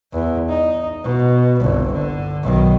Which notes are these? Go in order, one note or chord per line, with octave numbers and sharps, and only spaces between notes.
E2
D#4
B2
G1 C2
D3
B1 D#3